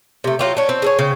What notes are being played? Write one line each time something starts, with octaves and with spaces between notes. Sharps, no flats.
C3 A3
F#3 F4 G4
C#4 D4
C4
G#4 A4 C#5
C#3 G5